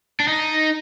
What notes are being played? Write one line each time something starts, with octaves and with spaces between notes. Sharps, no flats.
D4
D#4